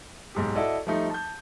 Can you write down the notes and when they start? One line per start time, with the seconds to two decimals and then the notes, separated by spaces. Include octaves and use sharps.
0.35 B1 G#2 G4
0.55 E4 F#4 A4 D5 D#5
0.87 F3 G3 A3 D#4
1.10 A5 G6